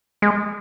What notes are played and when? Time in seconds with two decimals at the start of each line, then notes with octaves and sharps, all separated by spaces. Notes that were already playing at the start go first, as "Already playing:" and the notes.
0.22 G#3